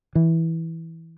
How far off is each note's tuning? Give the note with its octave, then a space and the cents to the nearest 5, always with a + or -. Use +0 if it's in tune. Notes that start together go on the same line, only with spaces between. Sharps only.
E3 -10